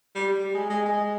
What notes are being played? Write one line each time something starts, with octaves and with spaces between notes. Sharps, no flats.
G3
G3
G#3
G#3
G#3